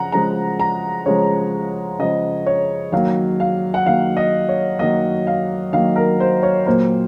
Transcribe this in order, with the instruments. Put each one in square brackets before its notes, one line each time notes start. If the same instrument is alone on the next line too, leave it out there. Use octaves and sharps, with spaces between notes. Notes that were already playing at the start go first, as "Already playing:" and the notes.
Already playing: [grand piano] C#3 F3 F#5 A#5
C#3 F3 G#3 A#5
A#5
C#3 F3 G#3 C#5
C#3 F3 G#3 D#5
C#5
D#3 F#3 A#3 F5
F5
F#5
D#3 F#3 A#3 F5
D#5
C#5
D#3 F#3 A#3 D#5
F5
D#3 F#3 A#3 F5
A#4
C5
C#5
A#2 F#3 A#3 C5